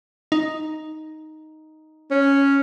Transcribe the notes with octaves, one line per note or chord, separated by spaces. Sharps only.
D#4
C#4